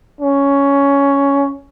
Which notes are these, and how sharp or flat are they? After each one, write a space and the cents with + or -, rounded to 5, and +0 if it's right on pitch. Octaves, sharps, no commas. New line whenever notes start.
C#4 +10